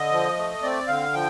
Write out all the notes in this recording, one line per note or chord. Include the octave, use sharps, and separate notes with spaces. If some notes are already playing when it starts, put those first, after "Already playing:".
Already playing: D3 D#5
F3
A3
C4 D5
D3 F5
F3 G5